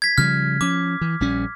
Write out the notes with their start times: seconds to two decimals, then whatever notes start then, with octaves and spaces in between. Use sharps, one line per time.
0.02 G#6 B6
0.18 C#3 F3 G3 F6
0.61 F3 C#4 D6
1.01 E3
1.20 A#1 G3 C#4